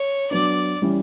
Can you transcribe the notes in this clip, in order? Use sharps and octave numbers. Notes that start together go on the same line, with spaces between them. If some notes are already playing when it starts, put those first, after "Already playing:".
Already playing: C#5
F#3 B3 D4 D5
E3 G3 C#4